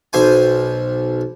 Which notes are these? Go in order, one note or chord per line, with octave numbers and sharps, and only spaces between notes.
B1 C5 G#5